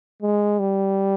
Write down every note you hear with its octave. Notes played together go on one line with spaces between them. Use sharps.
G#3
G3